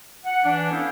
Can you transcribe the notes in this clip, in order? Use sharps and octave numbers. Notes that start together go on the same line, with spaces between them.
F#5
E3 D4
B3 C#4 E4 A4 C5 F5